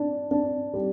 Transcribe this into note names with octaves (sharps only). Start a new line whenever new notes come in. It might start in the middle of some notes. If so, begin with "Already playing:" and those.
Already playing: D4
D4
G3